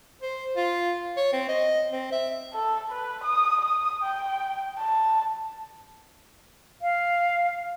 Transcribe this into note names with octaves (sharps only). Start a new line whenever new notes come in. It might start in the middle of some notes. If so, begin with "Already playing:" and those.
C5
F4
C#5
C4
D#5
C4
E5
A4
B4
D#6
D#6
G5
A5
F5